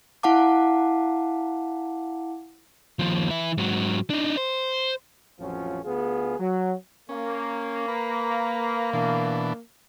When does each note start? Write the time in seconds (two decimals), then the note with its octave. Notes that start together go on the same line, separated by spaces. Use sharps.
0.23 E4 F5 F#5 A5 D6
2.99 D#2 F3
3.30 E3 E5
3.58 G#2 F#3
4.10 D4 D#4
4.37 C5
5.39 A1 F2 F3 F#3 C#4 F4
5.85 D2 B3 F4 G#4
6.40 F#3
7.09 A#3 C#4
7.88 B4 A#5
8.93 B2 E3 D4